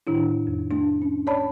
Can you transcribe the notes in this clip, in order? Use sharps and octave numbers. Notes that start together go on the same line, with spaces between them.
A2 D#3 D4 E4
F2
A3 D4
C#4
C#5 D5 A5 B5